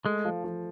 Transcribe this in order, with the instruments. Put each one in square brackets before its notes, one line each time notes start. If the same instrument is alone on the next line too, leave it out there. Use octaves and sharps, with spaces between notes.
[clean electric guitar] G#3 [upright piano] A3
[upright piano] F3
F3